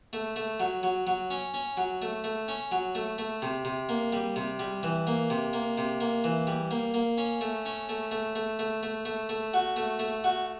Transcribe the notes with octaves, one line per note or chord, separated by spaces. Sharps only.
A3
A3
F#3
F#3
F#3
C#4
C#4
F#3
A3
A3
C#4
F#3
A3
A3
C3
C3
A#3
G3
C3
G3
E3
A#3
C3
A#3
C3
A#3
E3
G3
A#3
A#3
C#4
A3
C#4
A3
A3
A3
A3
A3
A3
A3
F#4
A3
A3
F#4